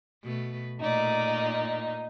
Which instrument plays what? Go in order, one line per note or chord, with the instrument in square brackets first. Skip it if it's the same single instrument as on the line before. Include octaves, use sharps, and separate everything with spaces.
[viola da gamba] B2 A3 B4
[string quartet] A#2 D#4 [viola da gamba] A3 D5